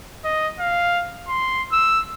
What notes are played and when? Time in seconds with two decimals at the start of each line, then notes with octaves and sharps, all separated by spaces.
0.24 D#5
0.60 F5
1.28 C6
1.72 E6